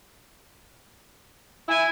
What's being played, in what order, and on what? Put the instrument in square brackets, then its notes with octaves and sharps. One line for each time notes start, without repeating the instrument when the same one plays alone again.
[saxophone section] E4 [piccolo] G#5